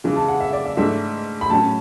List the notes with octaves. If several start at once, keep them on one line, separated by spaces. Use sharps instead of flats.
C#3 E3 G#3
A5
F#5
E5
D5
E5
G#2 E3 A3 D4 E5
B5
A2 F#3 C#4 A5